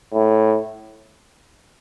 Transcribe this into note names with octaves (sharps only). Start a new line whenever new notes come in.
A2